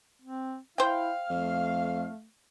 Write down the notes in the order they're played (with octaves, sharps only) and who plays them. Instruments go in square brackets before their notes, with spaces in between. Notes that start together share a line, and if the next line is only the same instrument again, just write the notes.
[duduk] C4
[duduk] E4 [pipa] C5 G5 [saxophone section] F5
[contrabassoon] F2 [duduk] A3